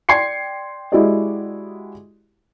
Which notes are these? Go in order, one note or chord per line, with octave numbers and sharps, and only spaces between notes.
D5 G5 C6 G#6 C7 C#7
G#3 E4 F#4 G4 D5 D#5